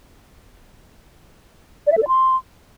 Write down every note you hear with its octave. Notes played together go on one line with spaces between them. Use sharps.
D5
E5
A4
D5
C6